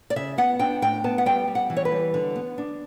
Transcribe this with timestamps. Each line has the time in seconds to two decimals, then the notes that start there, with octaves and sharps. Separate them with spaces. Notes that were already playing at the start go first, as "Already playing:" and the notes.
0.10 D5
0.16 C#3 E5
0.38 B3 F#5
0.59 D4 G5
0.82 A2 G5
1.04 B3 A5
1.18 F#5
1.26 G3 G5
1.48 G3
1.55 F#5
1.70 E3
1.77 C#5
1.85 B4
1.92 G3
2.14 D3
2.36 B3
2.58 D4